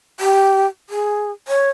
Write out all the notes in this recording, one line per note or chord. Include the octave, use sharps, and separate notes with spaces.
G4
G#4
C#5